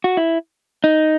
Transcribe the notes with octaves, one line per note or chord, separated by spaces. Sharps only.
F#4
E4
D#4